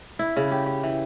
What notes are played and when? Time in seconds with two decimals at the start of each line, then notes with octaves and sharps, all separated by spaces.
0.19 E4
0.36 C#3
0.51 G4
0.66 G4
0.83 E3